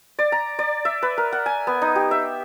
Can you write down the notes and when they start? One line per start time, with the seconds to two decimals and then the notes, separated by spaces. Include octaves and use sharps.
0.19 D5
0.32 A#5
0.59 D5
0.85 E5
1.02 B4
1.18 A#4
1.32 F#5
1.46 G#5
1.67 B3
1.82 D#4
1.96 G4
2.11 E5